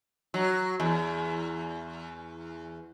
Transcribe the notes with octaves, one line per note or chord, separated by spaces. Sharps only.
F#3
E2